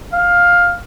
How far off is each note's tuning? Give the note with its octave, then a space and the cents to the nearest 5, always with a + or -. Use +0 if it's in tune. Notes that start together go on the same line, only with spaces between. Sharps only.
F5 +10